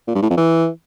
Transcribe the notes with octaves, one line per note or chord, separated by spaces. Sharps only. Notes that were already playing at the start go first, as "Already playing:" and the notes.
A#2
G2
A2
F2
E3